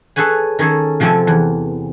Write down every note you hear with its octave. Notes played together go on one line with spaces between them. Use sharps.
G#4 A4 B4 C#5 G#5
D#3 C#4 G#4 A4
C3 F3 C4 G4 A4 G#5
E2